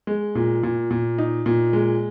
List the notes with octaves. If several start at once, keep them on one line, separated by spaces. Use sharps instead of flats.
G#3
A#2
A#2
A#2
D#4
A#2
G#3